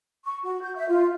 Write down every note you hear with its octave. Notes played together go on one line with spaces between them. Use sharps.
C#6
F#4
G6
E5
F4